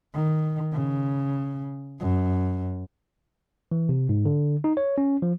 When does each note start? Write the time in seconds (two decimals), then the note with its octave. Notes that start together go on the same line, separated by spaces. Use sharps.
0.14 D#3
0.73 C#3
2.00 F#2
3.72 E3
3.89 C3
4.09 G#2
4.25 D3
4.64 D#4
4.77 C#5
4.98 C#4
5.22 F3